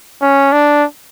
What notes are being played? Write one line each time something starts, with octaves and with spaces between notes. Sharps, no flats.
C#4
D4